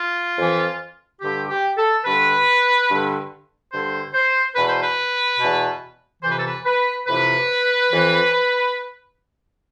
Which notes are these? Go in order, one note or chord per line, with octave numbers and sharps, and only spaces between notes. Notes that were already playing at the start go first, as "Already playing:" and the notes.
Already playing: F4
F2 E3
G2 D3 G4
G4
A4
G2 D3 B4
G2 D3
G2 D3 C5
C5
E2 B2 B4
C5
B4
E2 B2
F2 C3 E3 C5
B4
A4
B4
B4
F2 C3 E3 B4
F2 E3